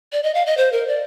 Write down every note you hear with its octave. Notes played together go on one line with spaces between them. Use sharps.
D5
D#5
F5
D#5
C5
A#4
D5